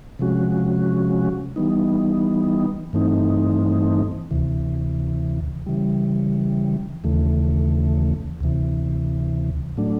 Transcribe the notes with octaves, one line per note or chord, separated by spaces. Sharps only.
C3 F3 G#3 C#4 F#4
E3 G3 B3 D#4
G2 E3 A3 C4 D#4
D2 C3 E3
C#3 E3 G3
D#2 C#3 E3 A3
D2 C3 E3
A2 F#3 A3 D4